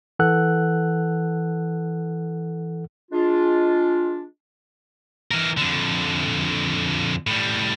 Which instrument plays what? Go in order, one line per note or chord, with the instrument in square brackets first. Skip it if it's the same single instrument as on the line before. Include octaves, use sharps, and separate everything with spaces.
[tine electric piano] E3 A4 F#5 F#6
[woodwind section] G#3 D4 F4
[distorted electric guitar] E3 A#4
F2 D3
A2 G3